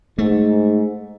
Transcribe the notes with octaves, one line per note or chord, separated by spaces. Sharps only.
G#2 A3